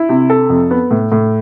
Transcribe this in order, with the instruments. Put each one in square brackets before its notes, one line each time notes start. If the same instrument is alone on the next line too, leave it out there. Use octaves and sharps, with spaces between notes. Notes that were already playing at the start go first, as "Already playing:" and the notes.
Already playing: [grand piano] E4
C3
A4
F2
B3
A2
A2